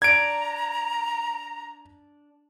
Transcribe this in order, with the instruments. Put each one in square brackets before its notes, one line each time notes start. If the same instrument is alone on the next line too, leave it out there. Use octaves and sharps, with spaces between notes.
[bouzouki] D4 [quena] A#5 [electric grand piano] G#6 D7